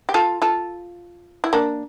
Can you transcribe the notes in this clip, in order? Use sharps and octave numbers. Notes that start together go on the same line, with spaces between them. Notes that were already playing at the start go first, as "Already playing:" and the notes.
G4
F4 A4
F4 A4
E4
A#3 D4